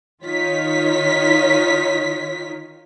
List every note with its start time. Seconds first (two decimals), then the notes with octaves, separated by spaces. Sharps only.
0.25 D#3 D#4 F4 C#5 B6